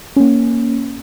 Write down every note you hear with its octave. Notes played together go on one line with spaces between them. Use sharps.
A#3 C#4